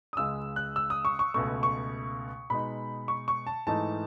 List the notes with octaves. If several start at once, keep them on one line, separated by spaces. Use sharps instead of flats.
D#6
C#2 C#3 G#3 E6
F#6
E6
D#6
C#6
C#6
C#2 B2 A3 C#6
C#6
B2 G#3 D#4 B5
C#6
C#6
A5
G#2 E3 A3 D#4 A5